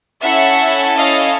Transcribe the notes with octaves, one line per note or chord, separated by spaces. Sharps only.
C#4 E4 A4 E5 F#5
D#5 F5